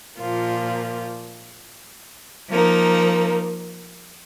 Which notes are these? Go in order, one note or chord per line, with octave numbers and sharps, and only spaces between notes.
A#2 F3 A#3 F4
F3 A#3 D#4